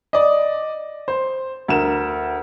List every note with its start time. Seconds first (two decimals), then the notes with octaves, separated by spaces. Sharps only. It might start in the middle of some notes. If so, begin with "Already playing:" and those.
0.13 D5 D#5
1.08 C5
1.68 D2 A#4 E7